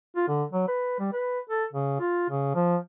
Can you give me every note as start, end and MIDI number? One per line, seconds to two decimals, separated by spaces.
0.16 0.26 65
0.28 0.44 50
0.52 0.65 54
0.68 0.99 71
1.00 1.09 55
1.13 1.39 71
1.49 1.64 69
1.73 1.96 49
2.00 2.29 65
2.30 2.51 49
2.55 2.77 53